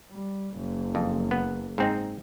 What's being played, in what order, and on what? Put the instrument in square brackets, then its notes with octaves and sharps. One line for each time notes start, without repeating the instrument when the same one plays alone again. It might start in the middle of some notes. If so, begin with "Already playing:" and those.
[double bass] G3
F#1
[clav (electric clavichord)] F2
B3
G#2 C4 D#4